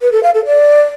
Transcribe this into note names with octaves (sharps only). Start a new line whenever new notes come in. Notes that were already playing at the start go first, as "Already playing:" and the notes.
B4
A4
F5
A4
D5